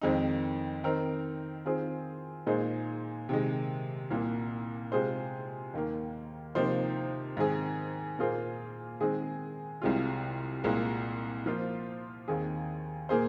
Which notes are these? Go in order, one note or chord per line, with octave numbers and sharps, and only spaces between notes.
F2 D#3 G#3 C4 D#4
D#3 C4 D#4 A#4
D#3 C4 F4 G#4 C5
A#2 G#3 D#4 G#4 C5
C3 D#3 G#3
C2 A#2 A#3
C3 G#3 F4 G#4 C5
D#2 D#3 A#3
C3 F3 A#3 D#4 C5
G#2 D#3 C4 G#4
A#2 A#3 F4 G#4 C5
D#3 G#3 C4 G#4
C2 C3 G#3 F4
C2 A#2 G#3
F3 A#3 F4 C5
D#2 D#3 C4 G#4
A#2 A#3 G#4 C5